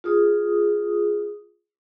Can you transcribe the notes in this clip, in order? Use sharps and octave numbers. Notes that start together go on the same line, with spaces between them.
F4 G#4 D#6